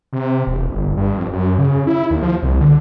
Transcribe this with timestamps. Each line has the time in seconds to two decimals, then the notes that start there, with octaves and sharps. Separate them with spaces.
0.13 C3
0.47 E1
0.69 G1
0.97 G2
1.18 F2
1.33 F#2
1.58 C#3
1.87 E4
2.11 D#2
2.23 F3
2.43 C2
2.61 D3